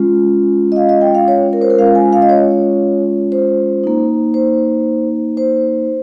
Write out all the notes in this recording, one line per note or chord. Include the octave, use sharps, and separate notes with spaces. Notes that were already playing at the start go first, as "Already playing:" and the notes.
Already playing: G#3 C#4 F4
D#5
F5
D#5
G5
F5
C#5
A#4
C5
A#4
G#3 C#4 F4 F5
G#5
F5
D#5
C#5
C5
A#3 D#4
C5
C5